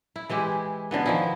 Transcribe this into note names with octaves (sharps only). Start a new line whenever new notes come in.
E4
E3 G#3 E4 G4
B2 D3 E3 B3
D#3 F3 E4